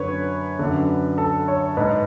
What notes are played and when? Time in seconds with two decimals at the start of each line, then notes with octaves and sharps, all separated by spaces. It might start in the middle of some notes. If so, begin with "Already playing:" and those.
Already playing: F#2 D3 B4 C#5
0.59 F#2 D3
1.18 A4
1.48 C#5
1.77 G#2 B4